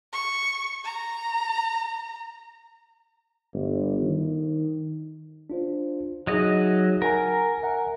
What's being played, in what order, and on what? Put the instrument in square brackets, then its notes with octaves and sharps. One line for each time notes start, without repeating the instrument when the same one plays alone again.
[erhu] C#6
A#5
[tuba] G1
D#3
[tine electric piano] D4 F4 C5
[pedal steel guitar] F#3 D#5 [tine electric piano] D#4 G#4 E5
[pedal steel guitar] A#4 [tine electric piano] F#5 G#5 A#5
[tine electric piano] E5 F#5 G#5